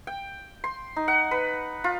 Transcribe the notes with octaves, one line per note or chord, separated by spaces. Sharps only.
G5
C6
D#4
F#5
B4
F4